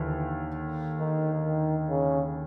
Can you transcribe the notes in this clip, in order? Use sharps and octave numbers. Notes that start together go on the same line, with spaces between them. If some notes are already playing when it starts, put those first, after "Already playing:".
Already playing: D#2 D3 E3
D#3
D#3
C#3